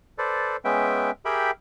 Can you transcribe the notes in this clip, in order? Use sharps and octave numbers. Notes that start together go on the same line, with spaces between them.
A4 B4 C5 D5
G#3 B3 C#4 B4 E5 G5
G4 G#4 A#4 E5 G5 B5